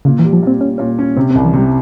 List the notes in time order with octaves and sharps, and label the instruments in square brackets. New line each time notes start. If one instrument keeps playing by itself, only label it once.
[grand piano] A#2 [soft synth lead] C#3
[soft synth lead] E3
[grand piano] G3
[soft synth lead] F3
[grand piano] A#2 [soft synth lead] C4
[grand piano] A#2 [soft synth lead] C#4
[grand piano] A#2 [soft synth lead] C#4
[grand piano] C#4
[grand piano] C3 [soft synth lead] C4
[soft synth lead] C4
[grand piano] C2
[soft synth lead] E3
[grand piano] C3 [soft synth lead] G3